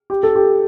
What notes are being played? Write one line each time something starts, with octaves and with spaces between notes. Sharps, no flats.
G4
A4
G4